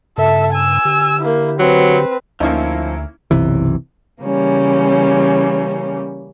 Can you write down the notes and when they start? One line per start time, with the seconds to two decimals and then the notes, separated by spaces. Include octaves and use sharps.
0.18 G2 C#3 A4 E5
0.53 G#5 E6
0.85 D3 G4
1.21 A#3 E4
1.59 F#3 C4 B4
2.40 D2 F3 A#3 C#4 D#4 E4
3.31 F#1 B1 C3 E3
4.22 C#3 E3 G3 A#3 C#4